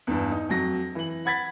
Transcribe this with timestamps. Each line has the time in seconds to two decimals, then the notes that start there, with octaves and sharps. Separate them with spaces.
0.07 E2 G2
0.31 D#4
0.49 F2 F#3 A#6
0.95 E3 F#7
1.25 F#5 B5 G#6 A6 B6